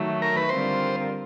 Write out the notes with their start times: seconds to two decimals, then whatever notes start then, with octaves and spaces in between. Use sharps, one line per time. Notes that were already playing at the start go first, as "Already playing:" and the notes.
Already playing: D#3 F#3 A3
0.22 A#4
0.36 B4
0.49 D3 G3 C4 F4 A#4 C5